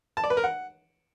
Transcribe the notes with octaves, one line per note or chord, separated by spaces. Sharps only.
A5
D5
B4
A#4
F#5